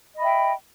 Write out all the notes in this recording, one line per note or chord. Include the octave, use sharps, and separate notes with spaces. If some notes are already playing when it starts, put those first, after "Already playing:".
D#5 E5 G5 B5